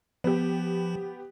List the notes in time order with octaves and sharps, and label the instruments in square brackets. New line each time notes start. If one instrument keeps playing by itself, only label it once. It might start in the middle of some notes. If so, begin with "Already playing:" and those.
[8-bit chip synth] F3 [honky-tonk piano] B3 G4